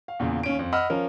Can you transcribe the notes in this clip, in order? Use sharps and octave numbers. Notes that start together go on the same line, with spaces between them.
F5
E2 A#2 C#3
D#2 C#4 D7
F2
D#5 F#5 B5 E6 F6
F3 C#4 A#4